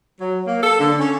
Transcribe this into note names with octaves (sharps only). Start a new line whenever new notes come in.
F#3
A#3
A4
D3
C#4